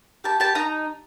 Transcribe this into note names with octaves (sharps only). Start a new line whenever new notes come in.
G4 A5
G4 A5
D#4 A#5